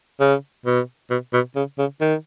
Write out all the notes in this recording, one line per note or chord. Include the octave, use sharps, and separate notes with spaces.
C#3
B2
B2
B2
C#3
C#3
D#3